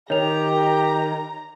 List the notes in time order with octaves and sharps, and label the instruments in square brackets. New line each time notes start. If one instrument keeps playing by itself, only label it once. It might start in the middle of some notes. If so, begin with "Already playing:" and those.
[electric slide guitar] D#3 [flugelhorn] G4 [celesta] C#5 F7 [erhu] A#5